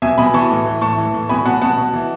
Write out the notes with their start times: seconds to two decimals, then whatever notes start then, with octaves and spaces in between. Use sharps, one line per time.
0.02 B2 E5 G#5
0.18 B2 G#5 B5
0.34 E3 A5 C#6
0.50 A2
0.65 E3
0.81 A2 A5 C#6
0.98 E3
1.14 A2
1.29 B2 G#5 B5
1.45 B2 F#5 A5
1.62 B2 F#5 A5
1.78 B2
1.93 E3